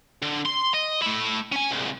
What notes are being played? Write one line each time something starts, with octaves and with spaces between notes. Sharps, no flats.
D3
C6
D#5
A3 E4
C#4 G#5
C2 G#2